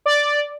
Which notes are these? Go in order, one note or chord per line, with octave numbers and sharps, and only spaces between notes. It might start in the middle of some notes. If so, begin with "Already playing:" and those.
D5